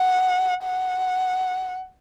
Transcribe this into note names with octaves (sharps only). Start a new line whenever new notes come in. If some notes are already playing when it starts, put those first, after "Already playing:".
Already playing: F#5
F#5